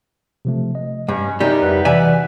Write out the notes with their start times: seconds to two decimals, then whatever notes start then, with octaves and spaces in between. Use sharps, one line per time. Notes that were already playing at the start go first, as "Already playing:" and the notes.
0.45 C3 F3 A3
0.75 D#5
1.09 G2 C#4
1.40 F#2 C3 G3 D#4
1.62 F2 E4 F#4 B4
1.85 C3 E3 D5 E5 G#5 B6